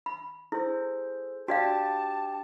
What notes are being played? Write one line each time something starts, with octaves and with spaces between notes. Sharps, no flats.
B5
E4 G#4 A4 C5
D4 F#4 G4 D5 F5 G5 A5